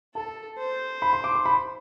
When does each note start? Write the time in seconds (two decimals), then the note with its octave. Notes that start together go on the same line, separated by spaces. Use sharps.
0.15 A4 A5
0.58 C5
1.02 B5
1.13 C6
1.24 D6
1.35 C6
1.46 B5